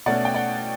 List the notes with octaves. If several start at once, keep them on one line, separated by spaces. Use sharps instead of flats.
B2 A3 C#4 D5 F#5
G5
D5 F#5